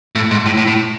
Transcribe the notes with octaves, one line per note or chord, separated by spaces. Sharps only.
A2
G#2
A2
A2
A2